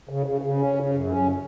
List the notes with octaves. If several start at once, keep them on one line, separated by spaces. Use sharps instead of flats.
C#3
C#3
C#3
C#4
C#3
F#2
C#4